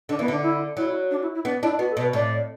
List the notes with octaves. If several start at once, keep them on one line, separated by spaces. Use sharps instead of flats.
D3 D4
E3 B3
D3 D4
E4
F#3 E4
D4
E4
E4
B3 D4
D4 E4
B3 F#4
A4
B2
B4
A2 D5